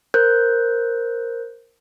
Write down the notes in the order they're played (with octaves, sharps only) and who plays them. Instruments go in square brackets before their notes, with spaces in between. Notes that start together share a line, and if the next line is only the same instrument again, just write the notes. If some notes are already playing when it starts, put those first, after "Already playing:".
[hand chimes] A#4 C5 F#6 G6